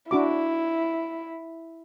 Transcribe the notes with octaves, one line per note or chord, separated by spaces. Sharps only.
D4 E4 F#4 D6